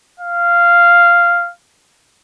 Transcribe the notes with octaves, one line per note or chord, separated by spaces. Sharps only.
F5